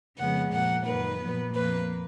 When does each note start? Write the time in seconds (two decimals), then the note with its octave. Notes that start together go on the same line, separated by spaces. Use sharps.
0.19 F2 C#3 F3 G#3 B3 F#5
0.53 A#2 F3 A#3 F#5
0.86 F#2 D#3 A#3 B4
1.21 A#2 F3 B3
1.54 F2 F3 A#3 B4